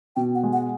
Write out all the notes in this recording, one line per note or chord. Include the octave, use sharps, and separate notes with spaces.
B2 G5
F#5
G#3
F#5